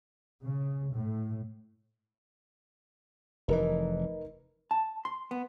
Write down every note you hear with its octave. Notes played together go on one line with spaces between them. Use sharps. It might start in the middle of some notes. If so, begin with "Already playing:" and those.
C#3
A2
F1 E3 D#4 A#4 B4
A5
C6
B3